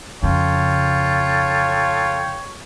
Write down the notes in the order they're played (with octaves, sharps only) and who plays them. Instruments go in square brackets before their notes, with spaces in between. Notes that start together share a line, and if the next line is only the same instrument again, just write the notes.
[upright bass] F2 C#3 [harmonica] F4 A4 G5 [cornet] C#5